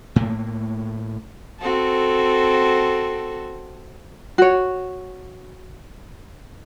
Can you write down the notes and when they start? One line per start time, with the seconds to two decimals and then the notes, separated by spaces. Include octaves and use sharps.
0.16 A2 A3 A#3
1.60 C4 F#4 A4
4.38 F#4 C#5